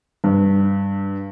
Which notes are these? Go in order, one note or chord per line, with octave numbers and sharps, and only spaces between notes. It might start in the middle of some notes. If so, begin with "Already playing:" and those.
G2